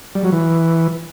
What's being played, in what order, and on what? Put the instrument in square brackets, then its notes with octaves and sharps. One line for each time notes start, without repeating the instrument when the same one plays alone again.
[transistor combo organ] G3
F#3
E3